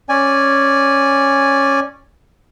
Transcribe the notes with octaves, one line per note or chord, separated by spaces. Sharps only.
C#4 D5 G#5